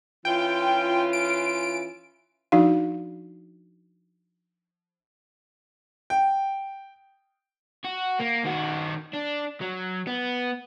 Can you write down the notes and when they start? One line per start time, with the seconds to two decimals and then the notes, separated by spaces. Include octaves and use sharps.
0.25 E3 C#4 F4 G5
1.13 D7
2.52 F3 D4 D#4 F#4 F5
6.10 G5
7.85 F#4
8.20 A#3
8.45 D#3 F#4
9.14 D4
9.61 F#3
10.07 B3